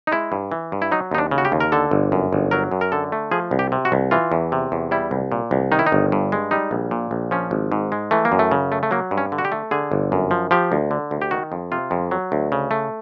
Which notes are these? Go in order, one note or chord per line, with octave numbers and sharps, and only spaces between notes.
D#4
G#3 E4
G2
E3
G2
E4
F#3 D#4
D#2 D#4
D4
C#3
F#4
G4
D#2
A#4
D3 A4
G1
F#2
G1
F#3 A#4
F#2
A#4
D3 A4
A3
F3 G#4
C2
G4
C3
F#4
C2
E3 F4
E2
C3
E2
G3 E4
C2
A#2
C2
D#3 D#4
E4
D#4
G1
G2
G#3
G3 D#4
A#1
A#2
A#1
F3 C#4
G#1
G#2
G#3
E3 A3
A#3
F#2
A3
C#3
A3
A3
F#3 A#3
G2
C#4
D3
F#4
G4
A3
D3 G#4
G1
F#2
F3
F3 G4
D2
D3
D2
G4
D#3 F#4
F2
C3 F4
F2
F#3
D2
C#3
A3